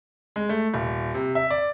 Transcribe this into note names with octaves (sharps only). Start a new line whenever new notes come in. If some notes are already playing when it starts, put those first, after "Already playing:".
G#3
A3
D#1
C3
E5
D5